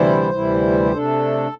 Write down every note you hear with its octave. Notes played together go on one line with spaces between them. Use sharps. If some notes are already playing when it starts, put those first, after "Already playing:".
Already playing: D2 C3 E3 G3 E4 C5
D2 C3 E3 G3 E4
G4
C3 A3 D4 A4